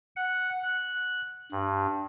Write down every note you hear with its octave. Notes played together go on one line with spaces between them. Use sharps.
F#5
F#6
G2